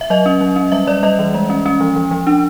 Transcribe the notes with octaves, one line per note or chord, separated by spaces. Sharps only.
E5
F#3 D#5
C#4
F#3
C#4
G3 E5
G3 D5
G3 D#5
E3
G#3
C#4
C#4
F3
F3
F3
D4